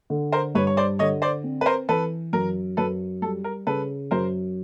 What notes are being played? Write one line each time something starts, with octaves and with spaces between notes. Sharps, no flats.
D3
A#4 C5
G2 B4 C#5
C#5
C5 D5
D3 C#5 D#5
C5 D5
C4
B4
A#4 C5
E3 A4 B4
F#2 A#4
F#2 A4 B4
G3 A4
A#4
C#3 A4 B4
F#2 A#4 C5